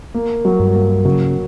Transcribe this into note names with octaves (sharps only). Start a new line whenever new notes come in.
A#3
F#3
G2
A#3
C#3 F#3